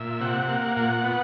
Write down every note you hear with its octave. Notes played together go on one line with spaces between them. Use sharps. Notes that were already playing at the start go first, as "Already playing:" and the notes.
Already playing: A#2 E5
C3 F#5
A#3
A#2 F#5
B3